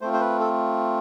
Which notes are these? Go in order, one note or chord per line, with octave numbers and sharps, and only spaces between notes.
A3 C4 F4 C5
C5
B4
A4